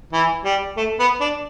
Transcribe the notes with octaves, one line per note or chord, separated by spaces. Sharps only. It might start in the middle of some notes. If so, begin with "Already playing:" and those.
E3
G3
A3
B3
D4